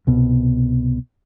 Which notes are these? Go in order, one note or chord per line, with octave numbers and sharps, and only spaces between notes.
C2 B2